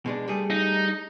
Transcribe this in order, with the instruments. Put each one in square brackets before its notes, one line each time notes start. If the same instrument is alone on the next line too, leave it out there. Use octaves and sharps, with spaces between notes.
[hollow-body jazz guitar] B2 G#3 D4
G3 A3 G#4
[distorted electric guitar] D#4